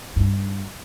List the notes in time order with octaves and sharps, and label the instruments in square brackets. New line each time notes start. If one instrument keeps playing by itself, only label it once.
[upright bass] G2